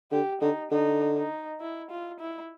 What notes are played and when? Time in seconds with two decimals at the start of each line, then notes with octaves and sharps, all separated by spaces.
0.12 D3 G4
0.41 D3 D#4
0.71 D3 D#4
1.17 D#4
1.61 E4
1.91 F4
2.20 E4